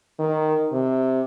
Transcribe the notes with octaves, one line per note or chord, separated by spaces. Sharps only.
D#3
C3